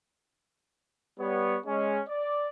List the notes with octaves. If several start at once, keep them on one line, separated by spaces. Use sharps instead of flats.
G3 B3 C#5
G#3 C#4
D5